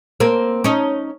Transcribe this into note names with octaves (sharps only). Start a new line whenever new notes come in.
A#3 C4
C#4 D#4